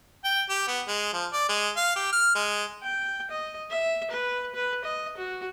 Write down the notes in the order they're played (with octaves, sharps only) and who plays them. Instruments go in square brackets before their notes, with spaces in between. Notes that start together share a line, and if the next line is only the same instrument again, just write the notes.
[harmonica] G5
G4
B3
G#3
F3
D5
G#3
F5
G4
F6
G#3
[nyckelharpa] G5
D#5
E5
B4
B4
D#5
F#4